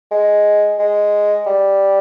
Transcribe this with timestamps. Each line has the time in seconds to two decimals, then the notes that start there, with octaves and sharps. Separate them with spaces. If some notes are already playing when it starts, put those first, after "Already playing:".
0.12 G#3
0.79 G#3
1.47 G3